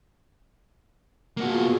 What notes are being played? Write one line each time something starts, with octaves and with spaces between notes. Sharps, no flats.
A#3 B3 F4 F#4 G#4